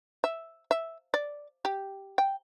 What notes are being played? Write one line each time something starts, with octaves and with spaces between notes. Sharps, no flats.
E5
E5
D5
G4
G5